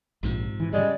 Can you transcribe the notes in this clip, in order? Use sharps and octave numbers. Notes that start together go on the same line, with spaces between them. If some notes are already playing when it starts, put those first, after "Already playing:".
A#1 G#2 C3 F3
E3
C#3 G3 G#3 D5